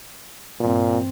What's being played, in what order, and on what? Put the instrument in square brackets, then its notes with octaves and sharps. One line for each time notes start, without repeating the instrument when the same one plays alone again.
[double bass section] G2 E3 C4 [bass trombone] A#2